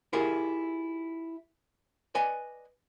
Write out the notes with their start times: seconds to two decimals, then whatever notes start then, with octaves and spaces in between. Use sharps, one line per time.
0.13 E4 F4 G4 G#4 A#4 E5
2.15 B4 D5 D#5 G#5